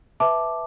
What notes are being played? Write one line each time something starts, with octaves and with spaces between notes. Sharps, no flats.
B4 E5 A5 D6